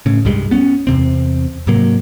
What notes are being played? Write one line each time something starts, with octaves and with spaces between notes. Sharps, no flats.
A2 C#3
C2 G2 G3 G#3
B3 C#4
E2 C3 C4
G#2 C3 F#3 A#3